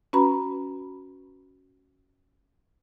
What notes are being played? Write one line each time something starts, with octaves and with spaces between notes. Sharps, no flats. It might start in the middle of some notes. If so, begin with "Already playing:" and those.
C#4 F#4 B4 A#5 B5